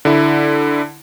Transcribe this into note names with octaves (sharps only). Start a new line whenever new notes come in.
D3 E4